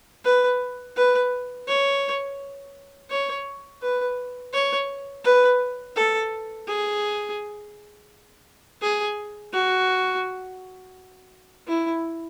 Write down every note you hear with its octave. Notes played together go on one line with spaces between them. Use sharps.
B4
B4
C#5
C#5
B4
C#5
B4
A4
G#4
G#4
F#4
E4